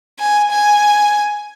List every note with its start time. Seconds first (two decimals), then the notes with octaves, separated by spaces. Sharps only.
0.19 G#5
0.51 G#5